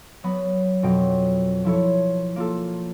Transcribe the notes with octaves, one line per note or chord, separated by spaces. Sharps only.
F#3 B3 B5
F2 B2 F#3 G5
F3 E4 A4 C#5
A#3 F4 A4